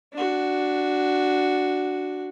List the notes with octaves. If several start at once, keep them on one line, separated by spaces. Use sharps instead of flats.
D4 F#4